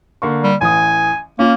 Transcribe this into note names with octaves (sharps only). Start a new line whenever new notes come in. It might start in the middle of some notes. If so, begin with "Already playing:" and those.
D3 A#3 C#6
G3
A1 E3 G#5 D#6
A#3 C#4 F4